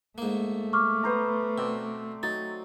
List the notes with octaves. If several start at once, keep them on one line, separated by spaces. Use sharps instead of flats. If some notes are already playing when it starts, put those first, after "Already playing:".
G#2 A3 A#3
C#6 D6 F6
B3 C5 A#5
B2 C4 D5
F#3 D#4 A6